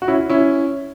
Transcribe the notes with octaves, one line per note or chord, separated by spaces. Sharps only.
F#4
C#4 E4
C#4 E4